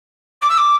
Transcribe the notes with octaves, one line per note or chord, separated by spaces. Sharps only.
D6
E6
D6